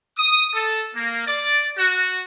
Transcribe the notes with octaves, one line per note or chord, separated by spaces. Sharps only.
D#6
A4
A#3
D5
F#4